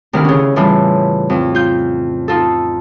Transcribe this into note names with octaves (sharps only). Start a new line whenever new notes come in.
D2 C3 D#3 E4 F6
C#3 C#4
A2 C#3 E3 G3 F4
F2 F4
F4 G6
D#4 F4 A4